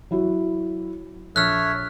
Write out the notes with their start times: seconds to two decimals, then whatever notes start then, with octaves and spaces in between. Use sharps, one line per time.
0.11 F#3 E4 F#4
1.36 A#1 A4 C#5 E5 F6 F#6